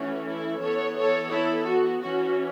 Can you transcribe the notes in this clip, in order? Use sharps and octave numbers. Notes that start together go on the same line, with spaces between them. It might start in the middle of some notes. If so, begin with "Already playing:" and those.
Already playing: E3 A3 C#4 F#4
E4 A4
E3 B3 A4 C#5
A4 C#5
E4 A4
F#4
E3 C#4 F#4